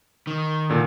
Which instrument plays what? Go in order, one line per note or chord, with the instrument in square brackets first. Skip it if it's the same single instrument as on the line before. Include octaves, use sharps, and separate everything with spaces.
[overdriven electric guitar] D#3
[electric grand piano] A#2 D3